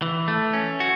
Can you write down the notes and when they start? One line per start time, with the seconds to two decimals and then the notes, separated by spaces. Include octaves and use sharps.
0.02 E3
0.28 A3
0.53 C#4
0.80 F#4